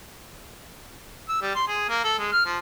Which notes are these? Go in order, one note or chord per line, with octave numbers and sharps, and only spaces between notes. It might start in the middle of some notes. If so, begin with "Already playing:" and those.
E6
G3
C6
G#4
A#3
A4
G#3
F6
F3